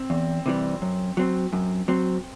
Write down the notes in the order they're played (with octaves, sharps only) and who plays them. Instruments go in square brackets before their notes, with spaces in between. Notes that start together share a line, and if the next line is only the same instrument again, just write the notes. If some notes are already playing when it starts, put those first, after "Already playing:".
Already playing: [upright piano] C4
[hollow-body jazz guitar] E2
C3 E3 G3
F#2
F#3 C4
F#2
F#3 C4